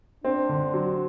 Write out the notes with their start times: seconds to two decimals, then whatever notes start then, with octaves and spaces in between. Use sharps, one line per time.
0.24 C4 D4
0.49 D3
0.74 F#3